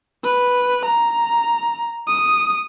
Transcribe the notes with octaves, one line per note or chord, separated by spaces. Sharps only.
B4
A#5
D#6